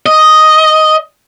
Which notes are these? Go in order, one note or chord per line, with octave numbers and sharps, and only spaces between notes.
D#5